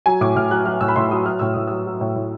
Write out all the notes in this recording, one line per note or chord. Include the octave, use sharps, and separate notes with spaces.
F#3 G#5
A2 D6
A2 F6
F#3 F#6
F#3 F6
A2 E6
B5
A2 C6
F#3 D#6
F#3 F6
A2 E6
A2 D#6
F#3 E6
F#3
A2
A2